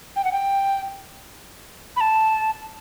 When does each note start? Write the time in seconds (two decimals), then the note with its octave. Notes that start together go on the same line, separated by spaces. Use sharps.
0.16 G5
0.24 F#5
0.32 G5
1.96 B5
2.01 A5